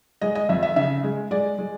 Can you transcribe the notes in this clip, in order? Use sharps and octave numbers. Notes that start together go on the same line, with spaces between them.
G#3 D#5
D#5
F2 E5
E5
C#3 E5
G#3
G#3 D5
G#3